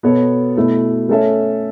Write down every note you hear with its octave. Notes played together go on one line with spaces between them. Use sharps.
B2 B3 A4 C#5
B2 A3 E4
A3 C#4 A4 C#5 E5